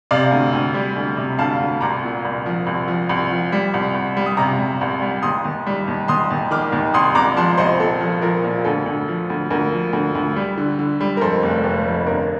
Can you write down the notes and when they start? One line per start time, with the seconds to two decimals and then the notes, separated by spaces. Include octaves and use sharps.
0.11 C3 D5 F5
0.31 D2
0.53 D2
0.74 G3
0.96 D2
1.17 C3
1.38 D2 F5 A5
1.60 D2
1.81 C2 A#5 D6
2.03 A#2
2.25 C2
2.46 F3
2.67 C2
2.88 F3
3.09 C2
3.31 F3
3.52 G3
3.74 C2
3.95 C2
4.17 G3
4.26 D#6
4.37 C3 A#5 D6
4.59 G3
4.81 C2
5.02 G3
5.23 D#2 C6 D#6
5.45 D#2
5.66 G3
5.88 D#2
6.08 D#2 C6 D#6
6.31 D#2
6.51 D#3 D6 F6
6.72 D#2
6.94 C2 C6 D#6
7.15 C2 A#5 D6
7.36 F3 A5 C6
7.58 C2 C5 D#5
7.80 A#2 A4
8.01 F3
8.22 F3 A#4
8.44 A#2
8.65 D2 A4
8.86 D2
9.08 F3
9.30 D2
9.50 D2 A#4
9.72 F3
9.93 D2
10.15 D2
10.36 G3
10.58 D3
10.79 D3
11.01 G3
11.17 A#4
11.21 F2 A4 C5
11.43 F1
11.64 F1
11.86 F2
12.07 G1 A#4